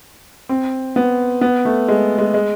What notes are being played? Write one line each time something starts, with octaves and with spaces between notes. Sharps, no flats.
C4
B3
B3
A3
G#3
G#3
G#3